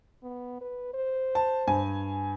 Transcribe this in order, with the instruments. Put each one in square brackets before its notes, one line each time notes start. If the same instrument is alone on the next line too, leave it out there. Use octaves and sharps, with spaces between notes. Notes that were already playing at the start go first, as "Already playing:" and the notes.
[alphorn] B3
B4
C5
[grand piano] A5
G2 G#5